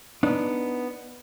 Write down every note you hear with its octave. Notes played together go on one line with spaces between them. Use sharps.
B3 D4 D#4